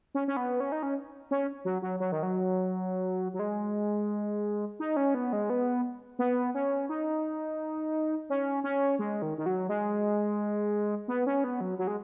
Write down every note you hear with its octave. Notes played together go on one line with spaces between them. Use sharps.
C#4
C#4
B3
C#4
D#4
C#4
C#4
F#3
F#3
F#3
D#3
F#3
F#3
G#3
D#4
C#4
B3
G#3
B3
B3
C#4
D#4
C#4
C#4
G#3
D#3
D#3
F#3
G#3
B3
C#4
B3
F#3
F#3
G#3